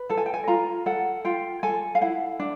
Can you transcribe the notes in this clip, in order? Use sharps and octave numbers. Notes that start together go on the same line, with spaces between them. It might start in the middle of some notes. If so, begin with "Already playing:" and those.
Already playing: B4
A4 A5
G#5
G5
G#5
F4 A#5
A4 F#5
F4 G5
A4 G#5
F5
E4 F#5
D4